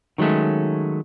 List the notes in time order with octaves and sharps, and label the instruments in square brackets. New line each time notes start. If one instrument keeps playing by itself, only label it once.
[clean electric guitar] D#3 F#3 G#3 A3 C#4